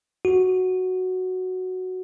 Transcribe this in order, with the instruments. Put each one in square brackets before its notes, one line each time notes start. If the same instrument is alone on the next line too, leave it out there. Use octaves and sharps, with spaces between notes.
[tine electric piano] F#4